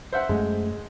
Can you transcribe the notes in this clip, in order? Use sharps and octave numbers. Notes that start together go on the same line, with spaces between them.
C5 E5 F#5
F#2 G#3 A3